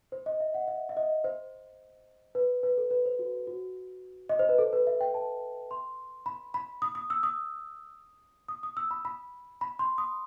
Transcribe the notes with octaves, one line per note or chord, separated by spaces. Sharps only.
C5
D#5
E5
F#5
E5
E5
D#5
C5
B4
B4
A4
B4
C5
F#4
F#4
D#5
C5
B4
A4
B4
E5
G5
A5
C6
B5
B5
D#6
D#6
E6
D#6
D#6
D#6
E6
B5
B5
B5
C6
D#6